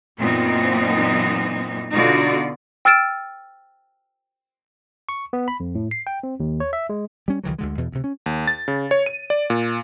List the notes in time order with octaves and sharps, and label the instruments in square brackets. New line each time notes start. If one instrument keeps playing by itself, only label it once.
[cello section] F#2 A#2 E3 B3 C4 D#4
B2 D3 D#4 F4 F#4 D5
[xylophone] G5 E6 F6 A6 D7 E7
[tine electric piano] C#6
B3
B5
F2
A2
C7
G5
C4
D#2
C#5
E5
G#3
[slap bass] G3 C#4
C#2 D#3 E3 F#3
D2 D3 G#3
E2 B2
D2 C3
C#4
[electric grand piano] D#2
A6
C#3
C#5
D#7
D5
A#2